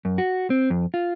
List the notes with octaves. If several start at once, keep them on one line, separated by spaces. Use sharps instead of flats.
F#2
F#4
C4
F2
F4